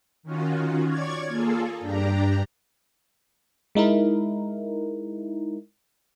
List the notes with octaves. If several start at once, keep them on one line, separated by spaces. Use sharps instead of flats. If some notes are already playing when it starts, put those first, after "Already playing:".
D#3 C#4 F4 F#4
C#5 D5 C#6 G#6
A#3 F4 G#4 A4
G2 D4 G4 A#5
G#3 D#4 E4 A#4